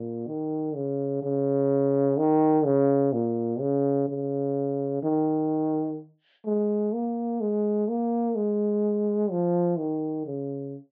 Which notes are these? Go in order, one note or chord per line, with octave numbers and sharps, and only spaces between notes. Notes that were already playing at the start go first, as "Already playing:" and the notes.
Already playing: A#2
D#3
C#3
C#3
D#3
C#3
A#2
C#3
C#3
D#3
G#3
A#3
G#3
A#3
G#3
F3
D#3
C#3